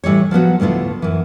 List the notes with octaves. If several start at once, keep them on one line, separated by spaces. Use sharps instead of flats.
A2 E3 G3 C#5
F3 F#3 B3 F#4
D2 A2 B3 E4 F4
F#2 E3